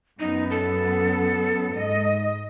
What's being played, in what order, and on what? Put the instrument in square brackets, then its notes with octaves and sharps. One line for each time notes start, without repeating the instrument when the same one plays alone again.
[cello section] F#2 B3 [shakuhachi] D#4
[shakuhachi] A4
[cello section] G#2 D#5